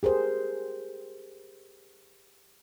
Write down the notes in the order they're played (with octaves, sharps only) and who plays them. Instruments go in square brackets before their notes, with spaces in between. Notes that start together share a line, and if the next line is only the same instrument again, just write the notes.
[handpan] G4 G#4 A#4 C5